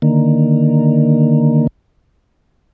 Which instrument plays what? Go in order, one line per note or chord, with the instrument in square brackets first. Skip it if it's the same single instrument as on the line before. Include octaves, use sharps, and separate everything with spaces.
[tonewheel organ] D3 D#3 A#3